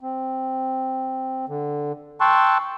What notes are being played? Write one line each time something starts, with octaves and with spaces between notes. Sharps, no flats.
C4
D3
G5 A5 C6 C#6 E6 F#6